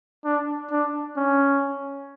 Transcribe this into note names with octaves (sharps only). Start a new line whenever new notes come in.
D4
D4
C#4